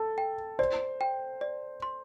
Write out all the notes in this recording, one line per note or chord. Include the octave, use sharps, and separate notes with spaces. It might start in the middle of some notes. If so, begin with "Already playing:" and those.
Already playing: A4
G5
C5 D5
G5
D5
C6